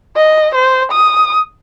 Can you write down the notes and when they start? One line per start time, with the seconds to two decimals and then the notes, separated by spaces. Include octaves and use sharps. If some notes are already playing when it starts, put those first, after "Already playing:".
0.16 D#5
0.55 C5
0.91 D#6